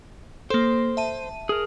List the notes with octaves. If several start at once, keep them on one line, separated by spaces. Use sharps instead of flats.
A#3 A4 C5
E5 A5 D#7
G#4 A#4